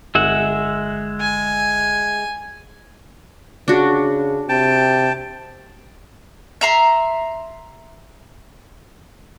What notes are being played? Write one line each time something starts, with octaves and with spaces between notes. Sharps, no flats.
G1 G#3 E5 F#5
G#5
C#3 D4 F#4
C3 G5 A5
E5 A#5 C6